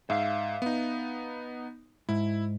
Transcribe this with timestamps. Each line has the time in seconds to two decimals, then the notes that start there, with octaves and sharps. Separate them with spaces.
0.10 G#2 E5 F5
0.62 B3 D#4
2.09 G#2 E4